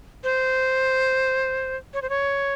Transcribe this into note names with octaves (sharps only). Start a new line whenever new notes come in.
C5
C#5
C5
C#5